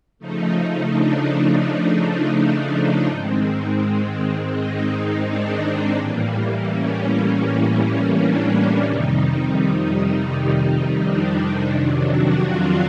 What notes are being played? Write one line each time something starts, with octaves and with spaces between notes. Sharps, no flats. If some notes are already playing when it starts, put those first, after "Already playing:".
C#3 F3 A3 D#4
D4
D4
G#2 D#3 G#3 C4
D#4
D4
A2 E3 G3 A#3
C#4
C#4
D4
F2 C3 D#3 G3 D#4
D4
F2 C3 D#3 F#3 D4
F#4
F4